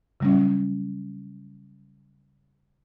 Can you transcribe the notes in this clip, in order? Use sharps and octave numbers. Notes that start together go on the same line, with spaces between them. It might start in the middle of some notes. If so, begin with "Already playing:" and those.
C#3 F#3 G3 A3 C#4